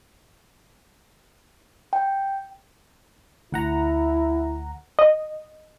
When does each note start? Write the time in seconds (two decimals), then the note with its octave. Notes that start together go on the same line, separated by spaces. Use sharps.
1.93 G5
3.52 D2 E4 F#5 A#5
4.99 D#5